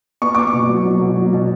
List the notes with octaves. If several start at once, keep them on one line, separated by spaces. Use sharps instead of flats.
B3 C#6
B3 D6
C#6
B2
F#3
F#3
B2
F#3
B2